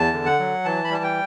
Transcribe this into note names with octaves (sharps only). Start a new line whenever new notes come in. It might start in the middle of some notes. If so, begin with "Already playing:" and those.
Already playing: E2 A5
D3
F#5
F#3
E3 A5
B5
G3 A5
G5